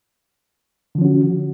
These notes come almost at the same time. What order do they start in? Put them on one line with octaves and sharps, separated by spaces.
D3 F3 C#4 F#4